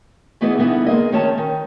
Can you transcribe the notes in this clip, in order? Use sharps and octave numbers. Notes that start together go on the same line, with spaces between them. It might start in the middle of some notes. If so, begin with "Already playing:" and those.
E3 A3 B3 E4 G#4 D#5
D3 G3 B3 D#4 E4
G#3 A#3 G#4 D#5
D#3 A3 C#4 C#5 A5
D#3